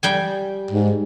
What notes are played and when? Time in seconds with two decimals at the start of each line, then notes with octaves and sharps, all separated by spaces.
0.03 G3 G5 G#5
0.71 G#2